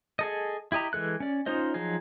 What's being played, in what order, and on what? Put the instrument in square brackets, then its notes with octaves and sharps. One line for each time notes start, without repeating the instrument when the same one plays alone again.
[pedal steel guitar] G#4 A4 D#5
E4 G4 D#5 A#5
E3 G#3 A4 F#6
C#4 D5
C#4 D#4 F4 C5 D#5
F3 F#3 D#4 G#4